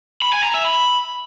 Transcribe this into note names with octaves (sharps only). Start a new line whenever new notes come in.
B5
G#5
A#5
E5
B5